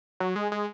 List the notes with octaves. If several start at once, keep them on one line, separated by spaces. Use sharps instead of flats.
F#3
G#3
G#3